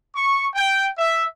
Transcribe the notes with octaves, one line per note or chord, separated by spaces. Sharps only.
C#6
G5
E5